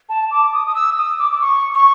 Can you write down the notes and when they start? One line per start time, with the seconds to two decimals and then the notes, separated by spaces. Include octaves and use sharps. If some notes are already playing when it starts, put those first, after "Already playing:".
0.09 A5
0.31 D6
0.53 D#6
0.67 D#6
0.75 E6
0.97 D#6
1.19 D6
1.33 D6
1.41 C#6
1.74 C#6